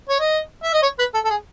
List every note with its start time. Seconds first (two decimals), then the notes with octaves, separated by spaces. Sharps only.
0.09 C#5
0.19 D#5
0.63 E5
0.73 D#5
0.82 C#5
0.99 B4
1.14 A4
1.24 A4
1.30 G#4